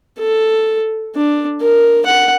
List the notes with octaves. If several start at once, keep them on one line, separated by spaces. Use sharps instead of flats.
A4
D4
A#4
F#5